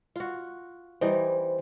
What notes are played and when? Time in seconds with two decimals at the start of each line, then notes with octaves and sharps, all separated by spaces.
0.16 F4 F#4
1.01 E3 G3 D#4 C5